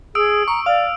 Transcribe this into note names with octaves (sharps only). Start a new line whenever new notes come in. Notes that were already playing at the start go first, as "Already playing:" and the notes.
G#4 D#6 E6 D7
A#5 C#6
D5 F5